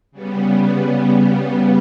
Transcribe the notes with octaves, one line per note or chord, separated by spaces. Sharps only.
C#3 G3 B3